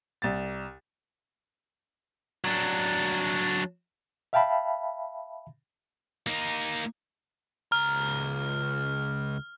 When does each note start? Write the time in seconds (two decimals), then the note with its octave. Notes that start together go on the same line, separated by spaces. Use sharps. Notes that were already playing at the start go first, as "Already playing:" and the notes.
0.22 C2 A6
2.44 F#3 D4
4.33 E5 F5 G5 A5 B5
6.27 A#3 D#4
7.72 C#2 A#5 F6